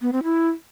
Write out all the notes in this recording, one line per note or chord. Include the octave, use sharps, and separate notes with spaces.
B3
C4
E4